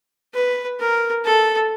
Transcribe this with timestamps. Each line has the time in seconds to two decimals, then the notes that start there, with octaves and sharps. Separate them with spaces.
0.34 B4
0.80 A#4
1.25 A4